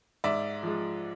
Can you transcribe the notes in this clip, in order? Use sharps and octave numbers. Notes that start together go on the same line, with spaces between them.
G#2 D5 E5
F3 G#3